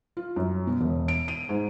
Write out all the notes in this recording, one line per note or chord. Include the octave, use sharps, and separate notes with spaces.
F4
F#2
B2
E1
D7
D#7
G#2